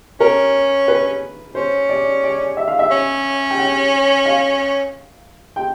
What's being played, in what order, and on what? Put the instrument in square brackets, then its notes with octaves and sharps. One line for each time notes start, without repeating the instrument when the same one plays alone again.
[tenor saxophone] C#4 [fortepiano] A#4
[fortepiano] B4
[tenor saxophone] C#4 [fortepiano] C5
[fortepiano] D5
D5
E5
F5
E5
[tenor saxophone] C#4
[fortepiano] G5
F#5
F5
G5